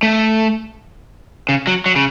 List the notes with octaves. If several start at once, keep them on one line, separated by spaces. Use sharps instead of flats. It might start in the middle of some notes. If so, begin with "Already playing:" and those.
A3
C#3
F#3
F#3
C#3